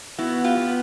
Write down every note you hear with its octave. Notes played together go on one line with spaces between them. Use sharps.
B3 E4 F#4
F4 G4
B3